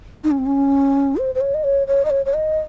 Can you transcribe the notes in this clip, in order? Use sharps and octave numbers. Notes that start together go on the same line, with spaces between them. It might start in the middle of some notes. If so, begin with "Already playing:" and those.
D#4
C#4
C4
C#4
C5
C5
C#5
D#5
C#5
C#5
D#5
C#5
C#5
D#5